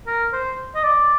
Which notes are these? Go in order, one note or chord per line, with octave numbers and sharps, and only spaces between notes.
A#4
C5
D#5
D5